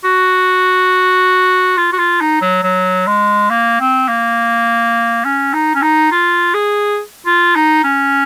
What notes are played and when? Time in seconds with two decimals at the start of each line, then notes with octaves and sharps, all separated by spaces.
0.04 F#4
1.78 F4
1.93 F#4
1.99 F4
2.21 D#4
2.42 F#3
2.63 F#3
3.07 G#3
3.50 A#3
3.80 C4
4.08 A#3
5.25 C#4
5.54 D#4
5.75 C#4
5.82 D#4
6.12 F4
6.54 G#4
7.26 F4
7.56 D#4
7.84 C#4